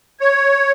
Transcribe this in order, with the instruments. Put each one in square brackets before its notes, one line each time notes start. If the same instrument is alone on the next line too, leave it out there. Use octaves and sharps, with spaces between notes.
[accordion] C#5